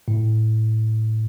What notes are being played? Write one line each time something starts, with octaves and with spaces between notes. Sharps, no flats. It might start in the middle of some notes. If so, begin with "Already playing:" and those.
A2